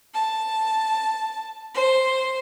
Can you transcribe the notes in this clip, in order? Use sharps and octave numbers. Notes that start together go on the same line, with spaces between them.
A5
C5